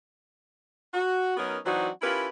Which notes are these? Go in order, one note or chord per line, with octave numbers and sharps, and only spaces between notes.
F#4
F#3 B3 C#4 D#4 A#4
E3 F#3 C4 D4 D#4 F#4
C#4 E4 F4 G4 A#4 B4